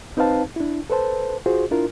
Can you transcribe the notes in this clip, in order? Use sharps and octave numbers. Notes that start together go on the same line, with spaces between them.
C4 D#4 B4 C5 F5 A5
D4 E4
A4 B4 C5 A5
F4 F#4 G#4 C5
D4 E4 F4 A#4